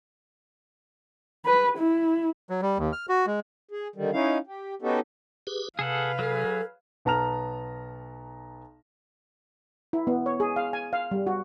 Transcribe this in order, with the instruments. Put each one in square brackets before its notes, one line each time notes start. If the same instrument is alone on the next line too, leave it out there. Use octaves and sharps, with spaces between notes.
[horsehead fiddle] B4
E4
[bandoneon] F#3
G3
D#2
F6
F#4
G#3
[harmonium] G#4
D3 D#3 G3
C#4 D#4 E4 F5
G4
B3 C#4 D#4 F#4 G4 A4
[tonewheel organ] G4 G#4 B4
[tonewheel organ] C3 [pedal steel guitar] G#4 A4 F#5 [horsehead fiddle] B4 F5
[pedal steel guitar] F#3 G#4 [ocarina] A4
[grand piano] B1 B3 A5 A#5 F6 F7
[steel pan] E4
B3
C#5
G#4
F5
G#5
F5
G3
F#4